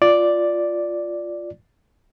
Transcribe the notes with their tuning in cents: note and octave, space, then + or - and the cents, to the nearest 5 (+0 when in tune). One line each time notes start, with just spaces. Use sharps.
F4 +0 D5 +0